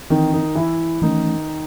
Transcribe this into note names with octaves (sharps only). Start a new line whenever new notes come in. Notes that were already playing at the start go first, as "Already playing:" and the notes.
D#3 E3 C4 D#4
D#3 D#4
E3 E4
D#3 E3 A3 C#4 D#4